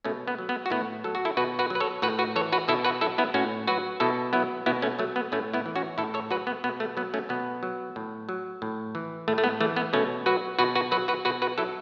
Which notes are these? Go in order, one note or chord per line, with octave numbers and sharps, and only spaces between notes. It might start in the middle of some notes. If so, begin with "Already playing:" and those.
B2 A3 C#4
B3
F#3
B3
F#4
A2 B3 E4
F#3 A4
F#4
E4 A4
B2 F#4 B4
F#4 B4
F#3 B4
A4 C#5
A2 F#4 B4
F#4 B4
E3 A4 C#5
F#4 B4
B2 E4 A4
F#4 B4
F#3 E4 A4
B3 E4
A2 C#4 F#4
F#3 F#4 B4
B2 E4 A4
F#3 B3 E4
B2 B3 E4
A3 C#4
F#3 A3
B3
A2 A3 C#4
B3 E4
E3
C#4 F#4
A2 E4 A4
A4 C#5
F#3 F#4 B4
B3
B2 B3
A3
F#3 B3
A3 C#4
B2 B3
F#3
A2
F#3
A2
E3
A2 A3
A3
B3
E3 A3
B3
B2 A3 C#4
F#3 F#4 B4
B2 F#4 B4
F#4 B4
F#3 F#4 B4
F#4 B4
B2 F#4 B4
F#4 B4
F#3 E4 A4